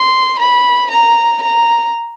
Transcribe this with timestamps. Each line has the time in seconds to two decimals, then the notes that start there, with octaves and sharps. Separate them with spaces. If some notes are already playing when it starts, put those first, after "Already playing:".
Already playing: C6
0.39 B5
0.90 A#5
1.42 A#5